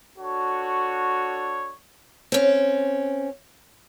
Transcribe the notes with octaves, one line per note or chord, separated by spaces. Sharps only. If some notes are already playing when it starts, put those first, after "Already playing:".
D4 F#4 A4 C#5
C4 C#4